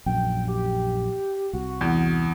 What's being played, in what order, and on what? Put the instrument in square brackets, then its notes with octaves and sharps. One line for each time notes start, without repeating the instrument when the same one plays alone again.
[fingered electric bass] A#1 F#2 [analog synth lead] G5
[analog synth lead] G4
[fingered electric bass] C2 [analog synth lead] F#4
[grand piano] E2